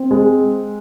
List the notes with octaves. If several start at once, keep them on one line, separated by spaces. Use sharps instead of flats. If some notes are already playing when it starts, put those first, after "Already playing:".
Already playing: C4
G#3